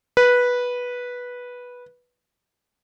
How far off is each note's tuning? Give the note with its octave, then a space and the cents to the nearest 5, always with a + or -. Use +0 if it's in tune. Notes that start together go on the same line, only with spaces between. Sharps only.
B4 -10